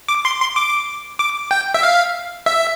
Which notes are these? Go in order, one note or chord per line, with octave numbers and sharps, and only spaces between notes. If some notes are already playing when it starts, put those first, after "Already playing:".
D6
C6
C6
D6
D6
G5
E5
F5
E5